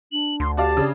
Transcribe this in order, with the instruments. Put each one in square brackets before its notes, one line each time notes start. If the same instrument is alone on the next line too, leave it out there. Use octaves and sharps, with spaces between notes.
[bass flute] D4 [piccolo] F#7
[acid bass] D2 [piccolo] C6
[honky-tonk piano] F#4 D5 F5 [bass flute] G4 [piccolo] A5
[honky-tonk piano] C#3 D4